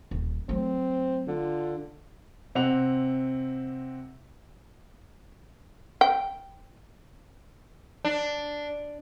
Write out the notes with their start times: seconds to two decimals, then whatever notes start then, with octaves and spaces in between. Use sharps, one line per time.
0.11 D#1
0.49 F#3 A3 C4
1.27 D3 F4
2.55 C3 C4 F#5 F7
6.01 G5
8.05 D4